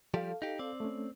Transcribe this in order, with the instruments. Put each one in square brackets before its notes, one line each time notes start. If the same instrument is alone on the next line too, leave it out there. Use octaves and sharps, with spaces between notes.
[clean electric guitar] F3 G3 G4 [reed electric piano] A4 F5
[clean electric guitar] D#4 G4
C4 D5
[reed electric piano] A3 C#4